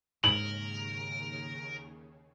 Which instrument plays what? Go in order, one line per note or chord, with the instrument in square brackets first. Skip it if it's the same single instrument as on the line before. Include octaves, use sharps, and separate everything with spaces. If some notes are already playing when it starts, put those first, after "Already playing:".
[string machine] D#2 C#3 [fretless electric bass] G#2 G#3 [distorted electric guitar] A#4 [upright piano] F#7